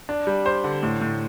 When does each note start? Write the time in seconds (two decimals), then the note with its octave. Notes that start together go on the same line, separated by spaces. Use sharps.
0.09 D4
0.27 G3
0.46 C5
0.64 D3
0.83 A2
1.01 A2